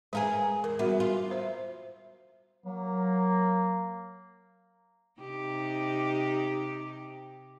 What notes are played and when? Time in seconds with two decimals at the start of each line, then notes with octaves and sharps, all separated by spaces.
0.13 G#3 G#4 A#4 B4 F5
0.64 E2 A#4
0.79 G3 B3 F#4 E5
1.00 F4
1.31 C5 E5
2.66 F#3 A#3
5.21 C3 D#4 G4